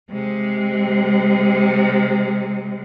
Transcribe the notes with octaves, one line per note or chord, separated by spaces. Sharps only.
C3 G#3